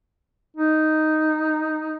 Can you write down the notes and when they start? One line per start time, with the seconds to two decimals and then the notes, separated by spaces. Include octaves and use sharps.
0.57 D#4